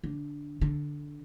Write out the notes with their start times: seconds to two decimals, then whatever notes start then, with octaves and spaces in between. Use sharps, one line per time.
0.04 D3
0.61 D3